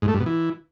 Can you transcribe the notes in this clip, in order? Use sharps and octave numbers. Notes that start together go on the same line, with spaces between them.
G#2
A3
G2
B2
E3